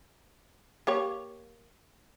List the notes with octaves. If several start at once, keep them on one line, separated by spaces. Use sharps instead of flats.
A#3 G4 C#5